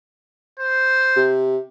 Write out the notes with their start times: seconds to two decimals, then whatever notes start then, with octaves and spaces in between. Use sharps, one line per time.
0.60 C5
1.16 C3